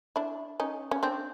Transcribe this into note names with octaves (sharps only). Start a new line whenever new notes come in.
D4 E4
C#4 D#4
C#4
C4 D4